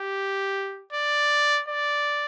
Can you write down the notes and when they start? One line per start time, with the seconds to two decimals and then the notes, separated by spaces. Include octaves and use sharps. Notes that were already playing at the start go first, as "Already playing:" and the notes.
Already playing: G4
0.93 D5
1.69 D5